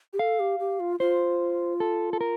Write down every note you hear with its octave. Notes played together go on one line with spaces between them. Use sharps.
G4
A4 F5
G4
G4
F4
F4 C5
A4
A4
A#4